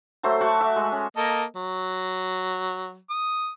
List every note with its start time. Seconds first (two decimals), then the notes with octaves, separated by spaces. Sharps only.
0.23 F#3 A3 C5
0.41 F#4 A5 C#6
0.60 E5 D6
0.76 G#3
0.92 C#4
1.17 A#3 A4 D#5
1.56 F#3
3.10 D#6